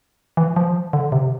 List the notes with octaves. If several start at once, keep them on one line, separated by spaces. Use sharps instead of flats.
E3
F3
D3
C3